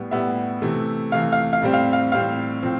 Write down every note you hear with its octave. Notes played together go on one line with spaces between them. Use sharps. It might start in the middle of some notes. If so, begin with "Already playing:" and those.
Already playing: A2 G3 B3
A2 G3 B3 E5
C3 E3 A3
C3 E3 A3 F5
F5
F5
A2 G3 C4
F5
F5
A2 G3 C4 F5
A2 F3 C4